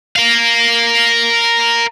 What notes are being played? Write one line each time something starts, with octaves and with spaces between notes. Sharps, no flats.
A#4 F5